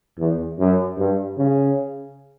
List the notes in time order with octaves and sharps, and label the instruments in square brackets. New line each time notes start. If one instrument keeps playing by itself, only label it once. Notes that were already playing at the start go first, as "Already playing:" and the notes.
[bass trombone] E2
F#2
G2
C#3